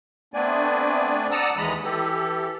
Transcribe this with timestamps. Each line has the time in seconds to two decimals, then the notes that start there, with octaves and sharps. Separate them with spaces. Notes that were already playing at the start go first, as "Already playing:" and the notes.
0.34 A3 B3 C4 D4 D5 G#5
1.31 D5 F#5 A5 A#5 D#6 E6
1.57 D#2 E3 G#3 A#5 B5 D#6
1.83 E3 G4 A4